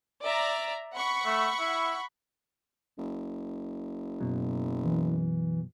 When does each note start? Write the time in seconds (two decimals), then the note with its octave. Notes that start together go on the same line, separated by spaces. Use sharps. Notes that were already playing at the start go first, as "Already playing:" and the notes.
0.22 D5 E5 A#5
0.93 F#5 B5 C#6
1.25 A3
1.59 E4
2.98 F#1
4.20 F#2 B2 F#3
4.84 E3